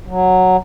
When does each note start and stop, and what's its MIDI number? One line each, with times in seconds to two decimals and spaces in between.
0.07 0.57 54